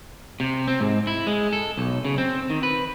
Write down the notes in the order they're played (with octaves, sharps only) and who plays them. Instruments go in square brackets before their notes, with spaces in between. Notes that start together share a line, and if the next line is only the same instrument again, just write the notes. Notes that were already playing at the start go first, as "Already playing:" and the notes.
[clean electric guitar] C3
C4
G#2
E4
G#3
A4
B1
C#3
C4
D#3
B4